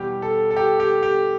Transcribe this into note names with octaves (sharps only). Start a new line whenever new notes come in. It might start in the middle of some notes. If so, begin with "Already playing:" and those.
Already playing: E2 B2 G3 G4
A4
A4
G4
G4
G4